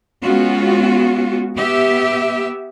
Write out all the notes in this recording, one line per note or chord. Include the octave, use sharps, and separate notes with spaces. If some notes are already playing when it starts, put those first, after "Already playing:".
G#3 B3 C#4 F4 F#4
B3 G4 E5